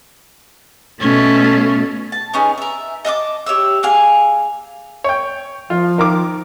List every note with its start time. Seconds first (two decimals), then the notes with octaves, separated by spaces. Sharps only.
1.01 B2 A3 C#4
2.12 A5
2.33 B3 C#4 D#4 G#4
2.58 A#4 E5
3.05 D#5 E5 A5 D6
3.46 G4 C#5 E5 E6
3.83 A#3 G#4 F5 G#5
5.04 C#5 G5
5.70 F3 F4
5.98 D#3 A#4 D6